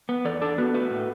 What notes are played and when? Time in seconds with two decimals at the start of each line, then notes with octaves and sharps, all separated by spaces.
0.09 B3
0.25 E2 A4 D5
0.42 D4 A4 D5
0.58 B3 F#4 B4
0.74 A3 F#4 B4
0.91 A2